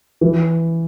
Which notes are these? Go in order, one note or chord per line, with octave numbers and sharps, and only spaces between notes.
E3